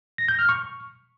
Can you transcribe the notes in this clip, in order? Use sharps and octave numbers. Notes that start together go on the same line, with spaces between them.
A#6
G6
F6
C#6